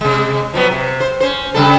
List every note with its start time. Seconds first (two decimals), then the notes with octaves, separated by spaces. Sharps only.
0.01 C3 G#3
0.54 F3 F#3 B3
0.71 C3
1.00 C5
1.20 C#4 C5
1.54 C#3 G3 A4